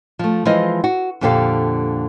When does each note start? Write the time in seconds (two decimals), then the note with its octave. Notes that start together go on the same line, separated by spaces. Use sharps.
0.19 F3 A3
0.45 E3 F3 G#3 C4 F4 D#5
0.84 F#4
1.21 F2 A#2 D3 G4 A4 F5